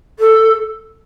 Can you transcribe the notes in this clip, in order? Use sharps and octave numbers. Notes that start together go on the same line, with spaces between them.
A4